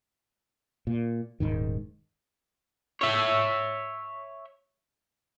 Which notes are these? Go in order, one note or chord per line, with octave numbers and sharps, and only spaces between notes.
A#2
D#1 B1 G#2 D#3
C#5 E5